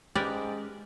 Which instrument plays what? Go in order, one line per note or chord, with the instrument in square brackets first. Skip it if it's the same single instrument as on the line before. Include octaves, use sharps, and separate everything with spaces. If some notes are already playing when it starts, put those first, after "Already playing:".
[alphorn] G#2 [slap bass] G#3 C#4 [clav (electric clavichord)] G4 [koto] A#4 B4 D5